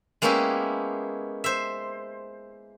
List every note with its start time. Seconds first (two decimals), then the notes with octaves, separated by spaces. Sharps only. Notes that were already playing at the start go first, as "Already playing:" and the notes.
0.22 G#3 A#3 B3 C#4 E4 G4
1.44 C5 E5